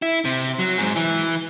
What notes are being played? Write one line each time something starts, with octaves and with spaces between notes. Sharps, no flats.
E4
C3
F#3
G#2
E3